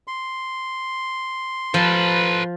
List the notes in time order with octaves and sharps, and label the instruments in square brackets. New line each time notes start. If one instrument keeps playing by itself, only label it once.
[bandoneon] C6
[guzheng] F3 [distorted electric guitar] A4 B4